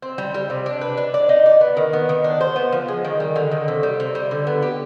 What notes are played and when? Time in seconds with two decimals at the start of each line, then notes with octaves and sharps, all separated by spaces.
0.02 C4
0.18 G3
0.34 G3
0.50 C3
0.66 D4
0.81 B4
0.98 D4
1.14 D5
1.29 D#4
1.46 D5
1.61 B3
1.77 D#3
1.93 B3
2.09 D#3
2.24 D4
2.41 C5
2.56 B3
2.73 F3
2.88 G#3
3.05 D#3
3.20 G3
3.36 D3
3.51 D#3
3.68 C3
3.83 G3
4.00 C3
4.15 G3
4.31 D3
4.47 B3
4.62 G4